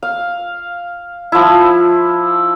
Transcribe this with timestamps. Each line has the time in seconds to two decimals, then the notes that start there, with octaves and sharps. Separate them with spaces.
0.03 F5
1.32 F3 E4